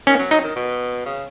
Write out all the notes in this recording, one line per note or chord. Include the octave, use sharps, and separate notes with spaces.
D#3 C#4
F#3
F#3 D#4
D#3
B2
C#3